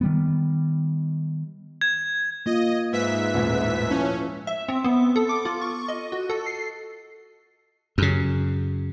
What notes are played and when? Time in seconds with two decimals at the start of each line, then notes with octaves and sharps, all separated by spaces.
0.01 D#3 G3 B3
1.81 G#6
2.46 A#3 F4 D#5
2.92 G#2 B4 E5 B6
3.34 D#1 A1 G#3 A3
3.90 F3 C#4 E4
4.47 E5
4.69 C4
4.84 B3
5.16 A4
5.29 D6
5.45 F4
5.61 C#6
5.88 D#5
6.12 F#4
6.30 A4
6.46 C7
7.98 F#2 C#3